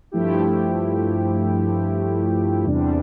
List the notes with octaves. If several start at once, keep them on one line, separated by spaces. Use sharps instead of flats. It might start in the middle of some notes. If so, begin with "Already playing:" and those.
G2 F3 A3 E4 G4
E2 C3 G3 D4